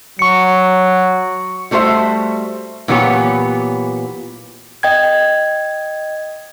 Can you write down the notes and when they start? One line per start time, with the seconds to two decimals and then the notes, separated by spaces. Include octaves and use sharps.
0.19 F#3 C#6 C#7
1.71 G3 A3 F#4 C5 E5
2.88 A#2 E3 F#3 B3 G4 C#5
4.83 D#5 G5 G#6